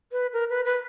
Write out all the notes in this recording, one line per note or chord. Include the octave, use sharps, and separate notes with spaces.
B4
A#4
B4
B4